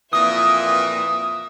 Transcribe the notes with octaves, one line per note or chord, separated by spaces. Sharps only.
F2 A#2 E3 E5 D#6